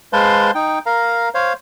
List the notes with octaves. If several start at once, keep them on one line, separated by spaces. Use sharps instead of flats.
G#3 B4 C5 F5 A5 C6
D#4 G5
A#4 F5 A#5
C5 C#5 F5